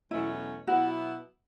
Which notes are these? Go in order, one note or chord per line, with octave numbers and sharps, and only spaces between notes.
E2 B2 F#3 A3 C#4 E4
B2 F#3 B3 E4 F#4